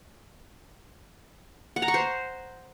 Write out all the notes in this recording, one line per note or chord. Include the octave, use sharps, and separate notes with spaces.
F#5
A#5
C#6
C5